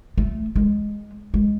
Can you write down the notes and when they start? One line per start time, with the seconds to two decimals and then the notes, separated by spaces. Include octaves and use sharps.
0.18 A3
0.56 G#3
1.34 G#3